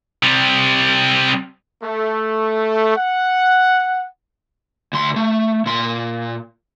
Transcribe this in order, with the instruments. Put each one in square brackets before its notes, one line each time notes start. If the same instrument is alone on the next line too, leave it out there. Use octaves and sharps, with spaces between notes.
[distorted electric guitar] C3 G3
[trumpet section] A3
F#5
[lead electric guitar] D2 C6
A3
A#2 C6